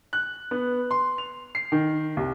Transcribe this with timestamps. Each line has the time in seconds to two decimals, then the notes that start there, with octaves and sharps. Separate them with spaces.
0.13 F#6
0.51 B3
0.91 C6
1.18 F7
1.55 C7
1.72 D#3
2.17 C2